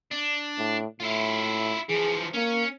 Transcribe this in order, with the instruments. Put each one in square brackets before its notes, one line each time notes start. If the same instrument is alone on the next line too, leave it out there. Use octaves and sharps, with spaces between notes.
[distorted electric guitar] D4
[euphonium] A2
[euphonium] A2 [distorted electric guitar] E4 F4
[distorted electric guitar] E3 F3 [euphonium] G#4
[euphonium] A#3 [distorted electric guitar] C#4